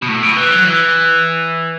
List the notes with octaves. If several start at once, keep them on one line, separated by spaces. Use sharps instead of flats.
B2
A2
B2
E3
F#3
E3